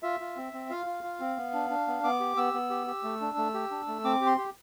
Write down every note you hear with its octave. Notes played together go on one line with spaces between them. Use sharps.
F4 E5
F4
C4
C4
F4 F5
F4
F4
C4
B3
D4
D4
B3
B3 D6
G4
B3 E6
B3
G4
G4
A3
D4
A3
G4
D4
A3
C4 D6
G4
C6
G4